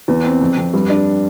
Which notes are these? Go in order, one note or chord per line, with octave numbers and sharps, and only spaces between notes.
E2
C4
F2
F2
G2
D4